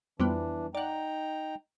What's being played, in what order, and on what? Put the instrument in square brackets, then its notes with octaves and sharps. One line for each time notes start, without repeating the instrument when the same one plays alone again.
[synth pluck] F2 G3 B3 [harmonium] E3 D4
[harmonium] D#4 G5 A#5 [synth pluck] D5 F#5